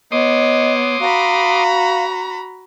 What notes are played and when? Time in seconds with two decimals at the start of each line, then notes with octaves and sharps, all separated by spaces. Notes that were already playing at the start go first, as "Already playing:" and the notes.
0.12 B3 C#5 D#5 C6 D6 D#6
1.01 F#4 F5 A#5 B5